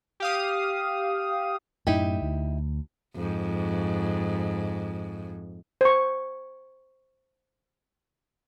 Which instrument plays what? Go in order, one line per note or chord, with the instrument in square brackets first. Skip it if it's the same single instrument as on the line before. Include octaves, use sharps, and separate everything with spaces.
[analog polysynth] G4 F5 D#6
[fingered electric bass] F#2 A2 [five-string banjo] D#4 E4 G4
[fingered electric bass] D2
[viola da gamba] F2 G#2
[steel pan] C5 C#6